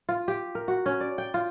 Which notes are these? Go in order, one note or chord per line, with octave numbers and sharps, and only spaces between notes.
F4
G4
A#4
F#4
C#4
D5
G5
F4